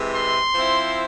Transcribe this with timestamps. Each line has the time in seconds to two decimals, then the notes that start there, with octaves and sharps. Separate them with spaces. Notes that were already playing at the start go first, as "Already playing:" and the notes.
Already playing: C3 E3 G#3
0.15 C6
0.54 F3 C4 E4